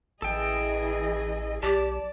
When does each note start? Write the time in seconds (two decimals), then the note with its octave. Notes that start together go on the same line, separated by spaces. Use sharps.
0.22 A1 E3 G#4 A4 D#5 G5
1.63 B1 G4 D5 A5